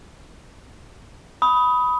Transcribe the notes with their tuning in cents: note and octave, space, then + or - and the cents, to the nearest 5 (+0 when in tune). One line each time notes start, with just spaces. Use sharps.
B5 +0 D#6 +20